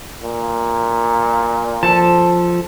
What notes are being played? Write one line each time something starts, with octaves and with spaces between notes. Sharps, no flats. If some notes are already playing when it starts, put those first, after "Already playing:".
A#2
F3 A4 A5